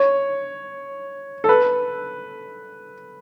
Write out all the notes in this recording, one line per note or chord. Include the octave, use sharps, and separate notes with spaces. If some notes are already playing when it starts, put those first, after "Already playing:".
Already playing: C#5
A4
B4